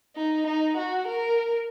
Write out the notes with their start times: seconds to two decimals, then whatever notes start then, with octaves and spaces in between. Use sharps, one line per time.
0.16 D#4
0.47 D#4
0.77 F#4
1.07 A#4